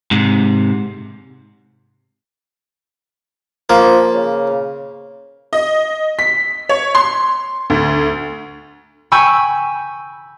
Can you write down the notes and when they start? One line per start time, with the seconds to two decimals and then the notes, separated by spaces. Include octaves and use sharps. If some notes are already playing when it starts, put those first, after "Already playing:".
0.11 G#2 C3
3.70 F3 A#3
4.14 C#3
5.53 D#5
6.19 B6
6.69 C#5
6.95 C6
7.70 D2
9.12 G5 G#5 B5 C#6 E6